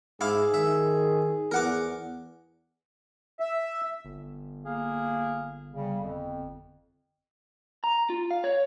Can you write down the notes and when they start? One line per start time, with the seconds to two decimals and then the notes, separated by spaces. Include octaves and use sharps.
0.21 G#2 E4 G#4 F5 D6
0.54 D#3 E5
1.51 E2 A#4 F#5 D6
3.40 E5
4.05 G1
4.65 A#3 G#4 F5
5.71 C#3 G3
6.00 F2
7.84 A#5
8.10 F4
8.31 F5
8.44 C#5